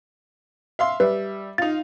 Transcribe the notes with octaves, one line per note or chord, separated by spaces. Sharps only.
E5 F5 C6
G3 B4 E5
D#4 F4 A6